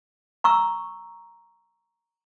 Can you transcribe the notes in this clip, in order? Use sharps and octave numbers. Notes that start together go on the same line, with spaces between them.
A#5 C#6 E6